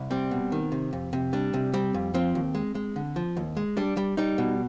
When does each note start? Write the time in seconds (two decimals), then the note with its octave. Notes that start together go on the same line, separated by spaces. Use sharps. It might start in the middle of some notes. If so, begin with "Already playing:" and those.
Already playing: C2
0.11 G3 C4
0.31 B2
0.52 D#3
0.72 C3
0.93 F2
1.13 C3
1.33 G3 D4
1.54 C3
1.74 G3 C4
1.94 F2
2.14 F3 C4
2.35 D#2
2.55 G#3
2.75 G#3
2.96 D3
3.16 F3
3.37 D#2
3.57 G#3
3.77 G3 D4
3.97 G3
4.17 G3 D#4
4.38 B2